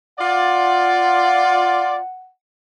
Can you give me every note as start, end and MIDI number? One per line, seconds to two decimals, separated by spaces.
0.19 1.98 65
0.19 1.98 74
0.19 2.28 78